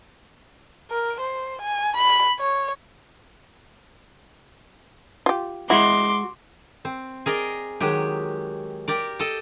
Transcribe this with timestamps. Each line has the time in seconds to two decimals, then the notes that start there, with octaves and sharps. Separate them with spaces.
0.91 A#4
1.21 C5
1.62 G#5
1.97 B5
2.40 C#5
5.26 F4 G4
5.70 G#3 E4 F#4 C6 D6
6.85 C4
7.26 G#4 A#4 D5 D#5
7.80 D#3 F#3 G#3 G4
8.88 G4 A#4 D5
9.19 A4 D#5 G5